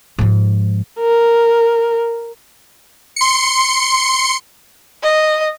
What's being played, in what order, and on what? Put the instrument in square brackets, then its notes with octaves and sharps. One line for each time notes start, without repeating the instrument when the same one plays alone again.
[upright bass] G#2 F3
[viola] A#4
[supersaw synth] C6 C#7
[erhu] D#5